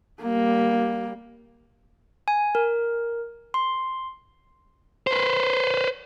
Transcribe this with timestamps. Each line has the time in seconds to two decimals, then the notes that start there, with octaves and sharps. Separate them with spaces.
0.22 G3 A#3
2.28 G#5
2.55 A#4
3.54 C6
5.07 B4 C5